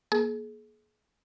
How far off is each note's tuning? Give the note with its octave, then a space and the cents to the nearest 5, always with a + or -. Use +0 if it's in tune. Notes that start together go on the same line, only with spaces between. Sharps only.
A#3 +25 G#4 +35